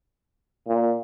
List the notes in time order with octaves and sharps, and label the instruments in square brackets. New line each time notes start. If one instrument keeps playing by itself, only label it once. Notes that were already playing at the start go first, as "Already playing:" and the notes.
[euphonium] A#2